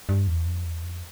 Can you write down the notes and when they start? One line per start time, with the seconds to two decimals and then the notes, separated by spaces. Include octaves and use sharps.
0.09 G2
0.27 E2
0.45 F2
0.65 E2
0.83 F2